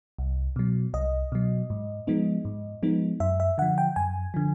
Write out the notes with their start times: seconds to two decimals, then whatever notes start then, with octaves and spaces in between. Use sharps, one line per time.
0.19 C2
0.56 B2 F#3
0.94 C2 D#5
1.32 B2 F#3
1.70 G#2
2.07 F3 G#3 B3 D#4
2.45 G#2
2.83 F3 G#3 B3 D#4
3.20 F#2 E5
3.40 E5
3.58 D3 F3 F#5
3.78 G5
3.96 F#2 G#5
4.34 D3 F3